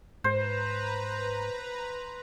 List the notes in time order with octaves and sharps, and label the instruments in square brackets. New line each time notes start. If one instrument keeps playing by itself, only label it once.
[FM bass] G#2 [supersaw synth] B4 A#5 [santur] C5